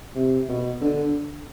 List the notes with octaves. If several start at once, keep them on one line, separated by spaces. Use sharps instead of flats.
C3
B2
D3